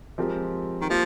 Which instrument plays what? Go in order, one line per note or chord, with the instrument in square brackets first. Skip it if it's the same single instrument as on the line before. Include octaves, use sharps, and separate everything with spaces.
[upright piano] F3 G#3 C4 G4 A#4
[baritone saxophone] D#3
[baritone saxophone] F3 [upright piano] G3 A#3